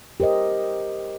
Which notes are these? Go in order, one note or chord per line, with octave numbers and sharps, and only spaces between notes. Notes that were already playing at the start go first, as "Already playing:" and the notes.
G4 A#4 C5 D#5